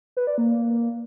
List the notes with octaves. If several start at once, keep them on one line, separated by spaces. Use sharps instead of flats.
B4
D5
A#3